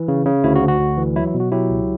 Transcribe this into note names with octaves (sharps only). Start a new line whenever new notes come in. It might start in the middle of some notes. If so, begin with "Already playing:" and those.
Already playing: E3
C#3
C#3
D2 E4
F#4
D2
F#4
D2
E3
F#3 E4
E4
B2
F#4
F#3 E4 G4
C#2